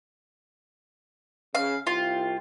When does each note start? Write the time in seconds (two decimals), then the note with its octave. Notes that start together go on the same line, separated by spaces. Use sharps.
1.55 C#3 F5
1.87 C2 F4 G5